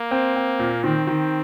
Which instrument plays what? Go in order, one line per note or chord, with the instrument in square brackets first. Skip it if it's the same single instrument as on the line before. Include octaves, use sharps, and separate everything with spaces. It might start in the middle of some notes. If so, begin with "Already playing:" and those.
Already playing: [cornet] A#3
[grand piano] C4
C4
A#2
[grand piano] D#3 [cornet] C4
[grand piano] D#3